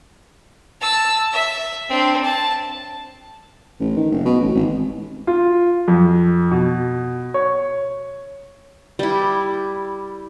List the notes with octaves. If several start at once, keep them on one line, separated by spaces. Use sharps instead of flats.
A5 E6
E5
C4 D4
A5
A1
D#3
F#1
B2
A1
G#1
F4
F2
B2
C#5
G3 E4